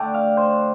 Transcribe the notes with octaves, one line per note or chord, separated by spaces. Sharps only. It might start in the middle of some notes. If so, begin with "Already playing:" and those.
Already playing: D3 A3 D4 G5
F5
C5